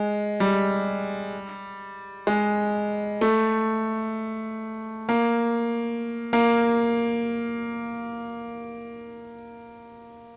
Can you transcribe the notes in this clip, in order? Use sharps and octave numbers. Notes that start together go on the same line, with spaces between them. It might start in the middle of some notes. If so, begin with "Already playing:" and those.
Already playing: G#3
G3
G#3
A3
A#3
A#3